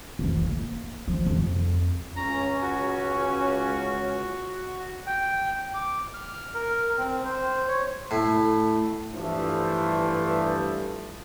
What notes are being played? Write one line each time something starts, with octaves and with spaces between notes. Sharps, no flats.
F2 E3
A#3
F3
F2
C#2 C#4 A#5
F#4
G5
D6
F6
A#4
C4
C5
C#5
A2
G2 E3 F3 A3